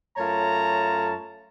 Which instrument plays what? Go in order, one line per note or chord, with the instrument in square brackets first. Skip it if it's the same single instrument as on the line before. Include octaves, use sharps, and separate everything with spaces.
[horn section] F#2 A3 F4 C#5 A5 A#5